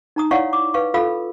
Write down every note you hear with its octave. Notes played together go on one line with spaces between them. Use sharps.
D#4 A#5 D#6
E4 C#5 D5 F5 F#5 C#6
D6
B4 F5 C#6
F4 A4 F5 B5 E6